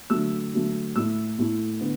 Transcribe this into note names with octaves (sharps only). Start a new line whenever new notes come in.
D3 F#3 A3 E6
D3 F#3 A3
A2 A3 E4 E6
A2 A3 E4
D3 B3